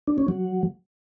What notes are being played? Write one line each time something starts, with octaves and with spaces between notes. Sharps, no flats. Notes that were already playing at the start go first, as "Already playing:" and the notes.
D4
C#4
F#3